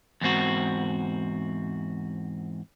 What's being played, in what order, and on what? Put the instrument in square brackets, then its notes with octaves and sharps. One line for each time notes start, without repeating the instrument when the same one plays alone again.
[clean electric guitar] E2 G#2 C4 F#4